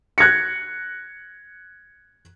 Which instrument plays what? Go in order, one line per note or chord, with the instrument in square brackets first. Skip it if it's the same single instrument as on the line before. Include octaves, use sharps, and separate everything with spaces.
[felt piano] F#6 G#6 A#6 C#7